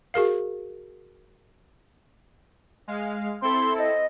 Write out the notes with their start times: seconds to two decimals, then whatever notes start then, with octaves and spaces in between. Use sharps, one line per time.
0.14 F#4 G#4 A#4 F5
2.88 G#3 F5
3.42 C4 E4 A4 C6
3.78 D#5